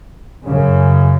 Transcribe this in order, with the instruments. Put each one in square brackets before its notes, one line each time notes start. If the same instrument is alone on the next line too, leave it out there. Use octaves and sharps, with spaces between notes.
[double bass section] F#2 C#3